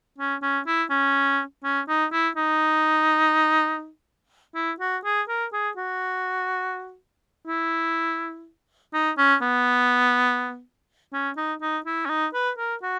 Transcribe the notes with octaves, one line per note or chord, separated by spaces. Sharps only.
C#4
C#4
E4
C#4
C#4
D#4
E4
D#4
E4
F#4
G#4
A#4
G#4
F#4
E4
D#4
C#4
B3
C#4
D#4
D#4
E4
C#4
D#4
B4
A#4
F#4